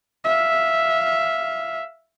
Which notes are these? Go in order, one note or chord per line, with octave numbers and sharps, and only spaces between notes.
E5 F5